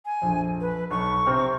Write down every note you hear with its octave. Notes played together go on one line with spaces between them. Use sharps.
G#5
A#1 F2
B4
B1 C#6
C3 C4 F6